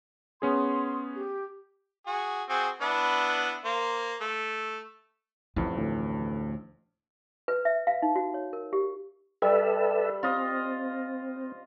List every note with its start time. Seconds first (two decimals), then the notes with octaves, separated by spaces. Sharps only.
0.42 B3 C#4 G#4 C6
1.15 G4
2.07 F#4 G#4
2.50 C4 F#4 G#4
2.81 B3 D4 E4
3.65 A#3 C5
4.21 A3
5.56 A1 F2 E3
5.77 D2 A2
7.48 B4
7.65 E5
7.87 F5
8.02 D#4
8.16 F#4
8.34 C#5
8.53 A#4
8.73 G4
9.42 G3 A4 B4 E5
10.23 C4 F4 D#5